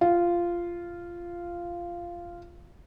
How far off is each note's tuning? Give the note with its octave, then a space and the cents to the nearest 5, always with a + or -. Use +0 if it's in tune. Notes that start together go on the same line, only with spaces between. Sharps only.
F4 -10